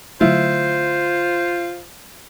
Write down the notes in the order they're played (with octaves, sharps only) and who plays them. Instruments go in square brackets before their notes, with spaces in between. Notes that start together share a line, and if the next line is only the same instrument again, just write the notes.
[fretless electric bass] D3 F#3 A3 [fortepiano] E4 [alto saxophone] F4 [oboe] C5